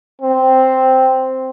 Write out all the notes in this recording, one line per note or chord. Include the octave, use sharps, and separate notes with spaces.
C4